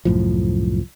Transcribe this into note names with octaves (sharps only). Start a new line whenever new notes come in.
C2 F#2 A2 F3